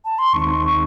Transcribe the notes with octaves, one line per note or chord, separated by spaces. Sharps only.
A5
C6
D#2 D#3 G#3 C4 D#4 C#6